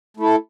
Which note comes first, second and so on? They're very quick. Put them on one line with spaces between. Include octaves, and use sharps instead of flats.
A3 E4 A4